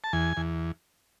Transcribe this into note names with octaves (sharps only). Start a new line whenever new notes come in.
A5
E2 G#5
E2